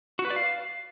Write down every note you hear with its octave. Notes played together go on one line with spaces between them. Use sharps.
F#4
B4
D5
F5